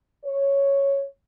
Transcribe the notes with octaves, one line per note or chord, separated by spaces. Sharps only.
C#5